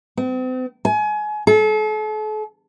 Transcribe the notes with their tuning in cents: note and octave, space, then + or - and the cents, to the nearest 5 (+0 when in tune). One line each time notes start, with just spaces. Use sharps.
C4 -40
G#5 +30
A4 -40